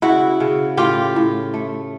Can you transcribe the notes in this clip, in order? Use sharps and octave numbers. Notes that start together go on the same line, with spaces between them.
C#3 E4 F#4
C#3
A2 F4 G4
A2
A3